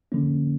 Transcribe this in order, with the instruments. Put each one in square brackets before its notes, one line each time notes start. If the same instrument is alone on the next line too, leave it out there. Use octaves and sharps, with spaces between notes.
[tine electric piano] D3 F3 A#3 C#4